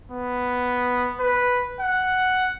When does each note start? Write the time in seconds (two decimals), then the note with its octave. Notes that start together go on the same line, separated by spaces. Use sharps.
0.11 B3
1.20 B4
1.80 F#5